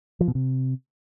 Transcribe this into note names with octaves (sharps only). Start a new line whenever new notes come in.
F3
B2
C3